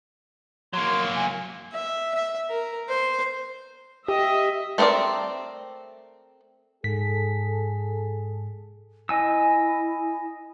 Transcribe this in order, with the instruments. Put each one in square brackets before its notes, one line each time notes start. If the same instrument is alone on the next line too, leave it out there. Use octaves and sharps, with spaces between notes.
[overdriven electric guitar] F#3 A#3 [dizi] C6
[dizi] G#5
[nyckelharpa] E5
E5
A#4
C5
[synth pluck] G4 [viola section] D#5 E5
[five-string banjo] A3 B3 C4 A#4 D5
[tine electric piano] G#2 B6 [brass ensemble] G#4 A4
[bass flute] E4 [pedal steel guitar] D#5 G#5 E6